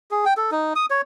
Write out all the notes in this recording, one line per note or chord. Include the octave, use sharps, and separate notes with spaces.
G#4
G5
A4
D#4
D#6
C#5